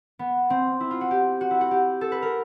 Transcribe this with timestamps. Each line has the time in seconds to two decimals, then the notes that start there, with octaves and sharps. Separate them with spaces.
0.19 B3
0.50 C4
0.80 E4
0.91 F4
1.01 F#4
1.11 G4
1.41 F#4
1.51 E4
1.61 F#4
1.71 G4
2.01 A4
2.12 B4
2.22 A#4